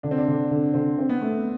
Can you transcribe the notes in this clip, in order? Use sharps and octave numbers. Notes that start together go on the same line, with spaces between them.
D3 D4
C4
D4
D3
D3
D3 C4
C4
B3
A3